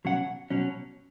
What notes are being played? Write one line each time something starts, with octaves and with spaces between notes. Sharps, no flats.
B2 F#3 C#4 F#5
B2 F#3 C#4